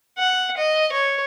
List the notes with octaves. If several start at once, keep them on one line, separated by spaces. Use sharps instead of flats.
F#5
D#5
C#5